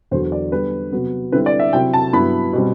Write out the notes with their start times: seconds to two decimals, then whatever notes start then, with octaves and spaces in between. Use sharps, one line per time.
0.11 E2 D3 F#3 C5
0.32 D5
0.52 D3 G3 B3 B4
0.92 C3 F#3 B3
1.32 D3 G3 C4 E4 B4
1.46 D5
1.59 E5
1.73 C3 F#3 C4 E4 G5
1.93 A5
2.13 G2 F#3 B3 E4 B5
2.53 B2 G3 C4